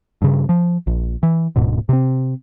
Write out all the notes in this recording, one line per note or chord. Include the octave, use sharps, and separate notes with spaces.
G2 C#3
F3
A#1
E3
D1 G#2 B2
C3 C4